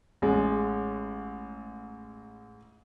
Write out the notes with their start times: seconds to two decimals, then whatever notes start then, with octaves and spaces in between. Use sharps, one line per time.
0.22 A1 G#3